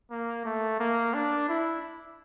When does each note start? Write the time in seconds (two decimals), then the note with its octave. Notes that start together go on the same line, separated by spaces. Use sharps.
0.11 A#3
0.45 A3
0.80 A#3
1.14 D4
1.49 E4